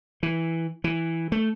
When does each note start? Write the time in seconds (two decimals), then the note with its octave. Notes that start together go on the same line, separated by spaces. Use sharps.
0.23 E3
0.84 E3
1.32 A3